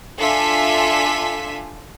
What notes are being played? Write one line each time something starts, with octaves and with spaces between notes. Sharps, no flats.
D4 F4 A4 E5 G#5 B6